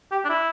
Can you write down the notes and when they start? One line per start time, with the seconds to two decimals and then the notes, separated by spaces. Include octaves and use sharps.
0.11 G4
0.24 D4
0.29 E4